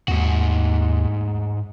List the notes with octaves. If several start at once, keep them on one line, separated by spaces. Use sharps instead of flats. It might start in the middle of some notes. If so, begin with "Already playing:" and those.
D#2 G#2 F#4